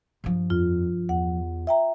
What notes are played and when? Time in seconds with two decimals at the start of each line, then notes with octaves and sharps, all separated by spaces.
0.24 G2 F3
0.50 F2 F4
1.09 E2 F#5
1.67 E5 G5 A#5